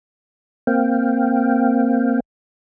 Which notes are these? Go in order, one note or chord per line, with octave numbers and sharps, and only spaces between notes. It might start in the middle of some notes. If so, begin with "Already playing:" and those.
A#3 C4 F5 G5